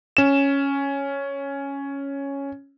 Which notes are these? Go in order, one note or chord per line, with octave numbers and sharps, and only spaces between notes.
C#4 E7